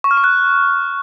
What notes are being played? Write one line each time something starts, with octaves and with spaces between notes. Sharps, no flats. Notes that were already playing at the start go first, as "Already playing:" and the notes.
C#6
F6
C#6
F#6